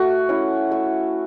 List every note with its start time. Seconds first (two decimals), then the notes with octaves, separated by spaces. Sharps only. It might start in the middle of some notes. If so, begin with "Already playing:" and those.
Already playing: A3 F#4
0.29 C#4 E4
0.71 A3